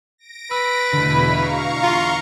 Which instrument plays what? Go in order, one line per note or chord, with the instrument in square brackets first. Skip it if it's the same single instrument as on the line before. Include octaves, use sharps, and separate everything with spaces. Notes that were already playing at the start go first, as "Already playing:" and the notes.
[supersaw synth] A#6 D7
[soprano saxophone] B4 [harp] E6
[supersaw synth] E2 B2 E4 [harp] D3 A3
[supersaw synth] F5 A#5 C#6
[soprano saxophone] F4